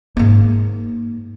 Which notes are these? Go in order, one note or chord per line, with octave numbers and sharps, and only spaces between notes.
G#2 A#3